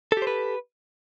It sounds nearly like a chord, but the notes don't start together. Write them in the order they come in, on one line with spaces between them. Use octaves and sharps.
A4 G4 C5 B4